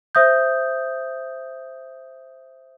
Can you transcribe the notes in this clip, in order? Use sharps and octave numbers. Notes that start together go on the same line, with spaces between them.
C5 E5 D#6 G6